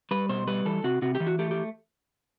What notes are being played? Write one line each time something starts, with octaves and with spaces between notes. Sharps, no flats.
G3 B4
B2 C5
G3 B4
E3 A4
C3 F#4
C3 F#4
G4
E3
F#4
A3 G4
G4